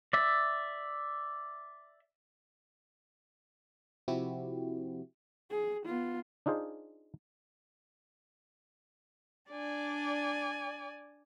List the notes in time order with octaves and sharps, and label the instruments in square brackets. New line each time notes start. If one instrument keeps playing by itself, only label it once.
[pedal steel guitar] D5 E5
[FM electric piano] C3 F3 C4 E4 F#4 G4
[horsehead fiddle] G#4
B3 F4
[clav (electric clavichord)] D4 D#4 F4 G#4 C5
[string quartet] D4 [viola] D5 G#5